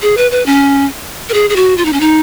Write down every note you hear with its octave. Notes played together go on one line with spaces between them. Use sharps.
G#4
B4
B4
C#4
A#4
G#4
G#4
F#4
F4
D#4
C#4
D#4